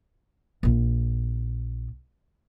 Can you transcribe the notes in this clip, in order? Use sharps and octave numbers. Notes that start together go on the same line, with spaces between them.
A#1 F4